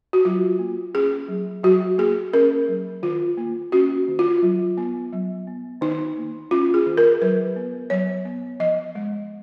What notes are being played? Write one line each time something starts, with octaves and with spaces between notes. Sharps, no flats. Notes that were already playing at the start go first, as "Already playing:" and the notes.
F#4
F#3 F4
A#3
C#4 G#4
F#3
F#3 F#4
A#3 G#4
C#4 A#4
F#3
D#3 F4
A#3
C#4 F#4
D#3
F4
F#3
B3
F#3
B3
D#3 D#4
A#3
C#4 F4
G#4
D#3
A#4
F#3 B4
B3
F#3 C#5
B3
F3 D#5
G#3